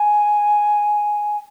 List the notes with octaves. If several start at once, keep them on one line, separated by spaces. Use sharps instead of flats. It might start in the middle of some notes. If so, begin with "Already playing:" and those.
Already playing: G#5